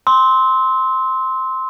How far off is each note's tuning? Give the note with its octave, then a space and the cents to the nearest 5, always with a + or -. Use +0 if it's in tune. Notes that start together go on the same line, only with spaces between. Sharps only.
C6 +0 E6 -35